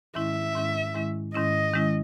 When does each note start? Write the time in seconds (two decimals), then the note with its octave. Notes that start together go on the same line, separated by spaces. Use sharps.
0.15 G#2 D#3 G#3 C#4 E4 E5
0.56 G#2 D#3 G#3 C#4 E4
0.95 G#2 D#3 G#3 C#4 E4
1.34 G#2 D#3 G#3 C#4 E4 D#5
1.74 D#3 G#3 C#4 E4